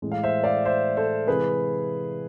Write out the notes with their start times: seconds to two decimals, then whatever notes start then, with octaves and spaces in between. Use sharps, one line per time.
0.02 A2 E3 G#3
0.12 F5
0.23 C5 E5
0.44 D5 F5
0.65 C5 E5
0.97 A4 C5
1.27 C3 E3 G#3 G#4 B4